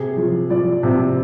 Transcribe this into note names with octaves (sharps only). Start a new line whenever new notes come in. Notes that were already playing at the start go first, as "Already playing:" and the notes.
Already playing: C3 G#4
F3
F3 D5
C3